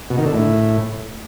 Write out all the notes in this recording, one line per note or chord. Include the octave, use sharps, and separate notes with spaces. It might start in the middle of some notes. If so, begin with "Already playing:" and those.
B2
D#3
D3
A2